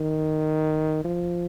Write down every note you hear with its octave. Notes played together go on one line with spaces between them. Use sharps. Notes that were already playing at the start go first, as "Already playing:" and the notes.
Already playing: D#3
F3